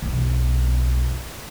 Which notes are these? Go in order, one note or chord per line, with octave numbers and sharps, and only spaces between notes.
B1 E2